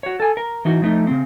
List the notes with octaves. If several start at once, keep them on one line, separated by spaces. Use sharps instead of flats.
F#4 C#5
A4 G#5
A#4
E3 D#4 F#4
F3 A3 D#4
C#3 C4